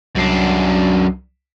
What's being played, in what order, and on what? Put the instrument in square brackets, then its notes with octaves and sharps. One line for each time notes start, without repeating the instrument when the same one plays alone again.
[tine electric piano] C2 F#3 C7 [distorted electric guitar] F#2 D4